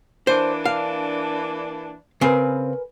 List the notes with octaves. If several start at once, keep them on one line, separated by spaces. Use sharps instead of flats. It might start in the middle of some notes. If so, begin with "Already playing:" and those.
E3 A#3 D4 C5
F5
C#3 C4 A#4 B4 G#5